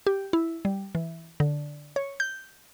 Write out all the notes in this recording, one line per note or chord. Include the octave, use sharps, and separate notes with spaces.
G4
E4
G3
E3
D3
C#5
G6